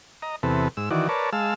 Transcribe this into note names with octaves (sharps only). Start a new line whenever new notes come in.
D#5 A#5
E2 C3 A4 B4
G#2 E6
D#3 E3 F#4 D5
A#4 B4 C#5 D5 A5
G#3 F5 A5 E6